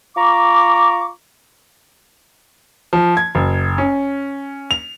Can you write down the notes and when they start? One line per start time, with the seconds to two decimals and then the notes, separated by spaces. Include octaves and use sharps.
0.16 F4 A#5 C#6 D6
2.93 F3
3.17 G#6
3.35 F#1
3.78 C#4
4.71 F7